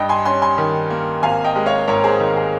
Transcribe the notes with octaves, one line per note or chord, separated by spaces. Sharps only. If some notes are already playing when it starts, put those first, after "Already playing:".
Already playing: G2 D#5 G5
G#5 C6
C#4 G#5 C6
G#5 C6
D#3
A#3
G#1 F5 G#5
D#5 G5
G#3
C#5 F5
G#2 A#4 C#5
G#4 C5
D#3
G#4